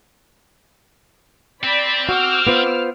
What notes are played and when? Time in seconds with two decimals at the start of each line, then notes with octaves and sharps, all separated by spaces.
1.63 C4 D5 B5 B6
2.09 F#4 D6 E6 F6
2.47 B3 F4 C5